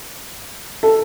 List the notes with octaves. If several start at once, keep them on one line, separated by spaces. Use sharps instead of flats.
A4